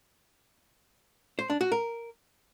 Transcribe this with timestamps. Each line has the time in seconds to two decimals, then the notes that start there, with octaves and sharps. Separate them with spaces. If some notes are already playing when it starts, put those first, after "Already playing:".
1.39 C5
1.50 D4
1.61 F#4
1.72 A#4